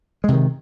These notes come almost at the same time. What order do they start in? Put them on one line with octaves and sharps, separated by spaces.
G#3 C3 D#3